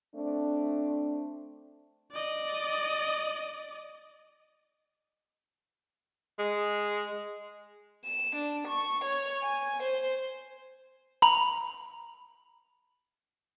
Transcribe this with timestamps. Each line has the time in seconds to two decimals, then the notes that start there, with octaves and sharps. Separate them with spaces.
0.16 A3 C4 D4
2.12 D5 D#5
6.39 G#3
8.04 E7
8.36 D4
8.68 C#6
9.04 C#5
9.43 G#5
9.83 C5
11.22 A#5 B5